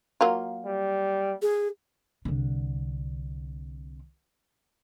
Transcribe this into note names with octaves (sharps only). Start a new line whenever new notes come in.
F#3 A#3 F4
G3
G#4
C2 D3